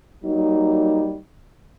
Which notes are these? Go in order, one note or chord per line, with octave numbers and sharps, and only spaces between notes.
F#3 G3 A#3 D#4